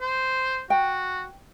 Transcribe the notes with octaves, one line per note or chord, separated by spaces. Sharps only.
C5
F#4 G5